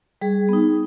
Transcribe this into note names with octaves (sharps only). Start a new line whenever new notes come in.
G3 G#4
B3 D#4